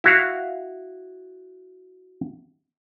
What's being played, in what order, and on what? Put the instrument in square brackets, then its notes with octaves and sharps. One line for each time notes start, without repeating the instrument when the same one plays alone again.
[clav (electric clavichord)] E4 F#4 F5